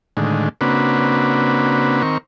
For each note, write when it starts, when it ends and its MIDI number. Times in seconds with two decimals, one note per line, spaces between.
0.17 0.49 45
0.17 0.49 50
0.17 0.49 51
0.17 0.49 56
0.61 2.02 49
0.61 2.02 58
0.61 2.02 60
0.61 2.02 62
0.61 2.02 66
0.61 2.02 71
2.03 2.18 51
2.03 2.18 60
2.03 2.18 70
2.03 2.18 85